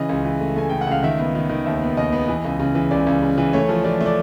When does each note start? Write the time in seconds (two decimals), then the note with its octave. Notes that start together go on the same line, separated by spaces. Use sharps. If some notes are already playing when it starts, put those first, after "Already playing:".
Already playing: C#3 E3 D#5
0.09 C#2
0.25 E3
0.40 A3
0.56 A3 G#5
0.69 A3 G5
0.81 F#5
0.87 C#2 F5
1.03 D#3 E5
1.19 B3
1.35 D#3
1.49 D#3
1.66 D#2 E5
1.82 B3
1.97 D#2 D#5
2.13 B3
2.28 E3
2.45 C#2
2.59 C#3
2.75 E3
2.91 C#2 D5
3.07 C#2
3.22 C#3
3.38 E3
3.53 A3 C#5
3.69 F3
3.84 F3 D5
4.01 A3
4.06 D5